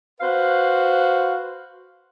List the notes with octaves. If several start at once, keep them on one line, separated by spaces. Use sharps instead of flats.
F#4 B4 C5 F5